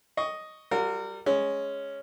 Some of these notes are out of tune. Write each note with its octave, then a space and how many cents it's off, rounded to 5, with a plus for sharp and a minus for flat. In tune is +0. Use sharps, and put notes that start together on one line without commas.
D#5 +0 C#6 +10
G3 +0 F#4 -45 A#4 -30
G#3 +0 C#4 +0